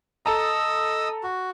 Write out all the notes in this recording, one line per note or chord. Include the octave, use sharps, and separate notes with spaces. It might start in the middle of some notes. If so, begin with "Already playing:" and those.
A4 D#5 A5 A#5 D#6 E6
F#4